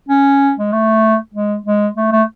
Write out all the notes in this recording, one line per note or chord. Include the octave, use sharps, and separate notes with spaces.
C#4
G#3
A3
G#3
G#3
A3
A3